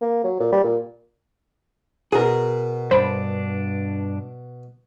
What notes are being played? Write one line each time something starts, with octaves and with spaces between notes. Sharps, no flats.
A#3
F#3
A#2
G3
A#2
B2 G#4 A#4
G2 D4 C5 B5